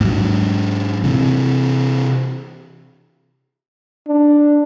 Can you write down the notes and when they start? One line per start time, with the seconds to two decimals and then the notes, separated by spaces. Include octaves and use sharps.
0.01 G#2 F#3
1.04 C3 E3
4.08 D4